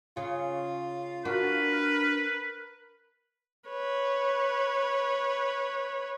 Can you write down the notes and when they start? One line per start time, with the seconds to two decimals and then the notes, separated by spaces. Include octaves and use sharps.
0.17 C#3 F4
1.25 D4 F#4 A#4 B4
3.69 B4 C#5